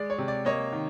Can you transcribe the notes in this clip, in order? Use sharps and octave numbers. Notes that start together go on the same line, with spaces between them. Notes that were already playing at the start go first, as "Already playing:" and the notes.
Already playing: G#3 D5
C#5
C3
D5
A#3 C#5 D#5
D#3